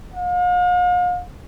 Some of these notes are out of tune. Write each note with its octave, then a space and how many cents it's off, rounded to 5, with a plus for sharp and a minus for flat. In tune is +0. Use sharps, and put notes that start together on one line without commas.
F5 +45